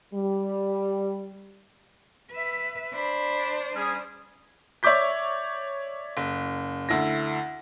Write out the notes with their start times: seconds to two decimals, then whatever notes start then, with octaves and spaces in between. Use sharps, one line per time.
0.13 G3
2.32 B4 E5
2.94 D4 C5 B5
3.76 G3 C#4 G#4
4.83 C#5 D5 E5 D6 G6 B6
6.17 F#1
6.89 D2 E4 A#6